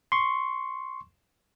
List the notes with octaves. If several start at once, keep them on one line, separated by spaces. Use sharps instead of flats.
C6 C#6